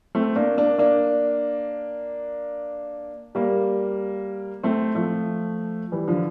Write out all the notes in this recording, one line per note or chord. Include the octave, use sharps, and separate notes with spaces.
A3 C4
A#3 D4
A#3 D4
A#3 D4
G3 A#3
A3 C4
F3 A3
E3 G3
D3 F3